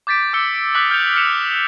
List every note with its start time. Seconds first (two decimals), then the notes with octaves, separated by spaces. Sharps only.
0.07 D6 G6 A6 B6 D7
0.33 D6 E6 C#7 G7
0.54 D7
0.75 D6 D#6 F#6 G6 B6 F#7
0.90 F6 G6 C#7 F7
1.14 F6 B6 C#7 E7 F7